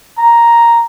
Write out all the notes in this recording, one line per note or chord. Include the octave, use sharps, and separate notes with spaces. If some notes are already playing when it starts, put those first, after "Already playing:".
A#5